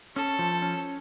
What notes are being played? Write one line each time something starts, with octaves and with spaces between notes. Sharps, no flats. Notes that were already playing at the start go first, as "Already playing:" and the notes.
C#4 A4
F3
C#4